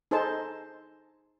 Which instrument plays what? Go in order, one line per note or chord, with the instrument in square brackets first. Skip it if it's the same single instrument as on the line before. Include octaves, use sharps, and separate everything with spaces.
[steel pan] D#4 G#4 A4 C5 A5